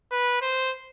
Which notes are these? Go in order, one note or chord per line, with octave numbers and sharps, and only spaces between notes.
B4
C5